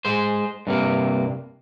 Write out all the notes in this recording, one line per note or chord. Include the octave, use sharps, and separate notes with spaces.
G#3 C5
G2 C3 A#3